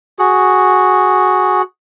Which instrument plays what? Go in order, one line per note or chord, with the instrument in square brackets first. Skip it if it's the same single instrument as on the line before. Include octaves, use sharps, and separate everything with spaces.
[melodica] F#4 G#4